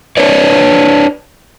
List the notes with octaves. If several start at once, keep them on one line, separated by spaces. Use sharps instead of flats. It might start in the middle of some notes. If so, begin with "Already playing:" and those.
D4 B4 C#5 D5